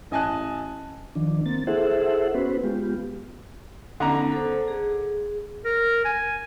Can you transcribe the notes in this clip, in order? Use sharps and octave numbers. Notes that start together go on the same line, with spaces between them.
A1 D#5 G#5 A5 F#6
D#3 F3 D4
A#3 C4 A6
E4 G#4 A4 C5 E5 F#5
B3 C#4 F#4 B4 C5
G#3 B3 F4 G4
D3 B3 C#4 D#4 A#5
A4 C5
G#4
A#4
G#5